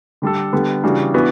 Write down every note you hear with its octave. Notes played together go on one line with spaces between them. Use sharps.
D3 G3 D4 A4
D3 G3 B3
C#3 E3 G3 D4 F#4
E3 B3 D4 F#4